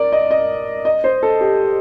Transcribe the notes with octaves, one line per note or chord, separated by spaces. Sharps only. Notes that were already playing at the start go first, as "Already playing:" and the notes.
Already playing: A#4 D5
D#5
D#5
D#5
C5
A4
G4